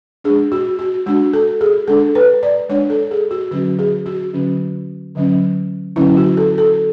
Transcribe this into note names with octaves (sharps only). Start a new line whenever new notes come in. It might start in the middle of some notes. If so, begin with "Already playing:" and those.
G#3 D4 G#4
F#4
F#4
G#3 D4 F#4
A4
G#4
G#3 D4 A4
B4
D5
G#3 D4 C#5
A4
G#4
F#4
D3 F#3 C#4 F#4
G#4
F#4
D3 F#3 C#4
D3 F#3 C#4
D3 F#3 C#4 E4
F#4
A4
A4